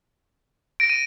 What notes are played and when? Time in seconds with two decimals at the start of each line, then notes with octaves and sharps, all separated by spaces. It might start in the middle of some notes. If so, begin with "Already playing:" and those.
0.80 A#6 D7
0.90 D#7